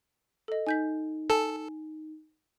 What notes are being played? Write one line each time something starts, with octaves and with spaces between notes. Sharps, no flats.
A4 D#5
D#4 G#5 G6 B6
A4 G#5